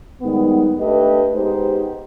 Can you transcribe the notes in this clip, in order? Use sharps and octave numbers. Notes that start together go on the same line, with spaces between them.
G#2 D#3 G3 B3
A3 D4 G4 B4 D#5
G#3 B3 D#4 G4 C5